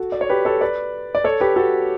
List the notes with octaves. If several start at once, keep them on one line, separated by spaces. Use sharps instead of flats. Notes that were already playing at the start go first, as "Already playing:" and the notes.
Already playing: F#4 A4
D5
C#5
G4 B4
A4 C#5
B4 D5
D5
A4 C#5
G4 B4
F#4 A4